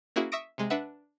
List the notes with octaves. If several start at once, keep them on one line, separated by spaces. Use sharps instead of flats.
A#3 C#4 E4 F#4 G#4
E5 C#6 D#6 A#6 D7
C3 G#3
D4 B4 E5 F#5